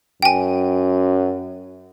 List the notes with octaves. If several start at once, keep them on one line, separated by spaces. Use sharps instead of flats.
F#2 G5 G#5